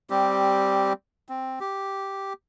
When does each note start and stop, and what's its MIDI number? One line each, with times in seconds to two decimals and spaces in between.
0.10 0.93 55
0.10 0.93 60
0.10 0.93 67
1.29 1.59 60
1.60 2.33 67